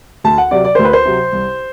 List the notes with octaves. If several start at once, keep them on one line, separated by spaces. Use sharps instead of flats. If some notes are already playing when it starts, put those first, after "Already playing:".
D2 A5
F#5
C3 F#3 D5
D5
D2 C5
B4
C5
C3 F#3
C2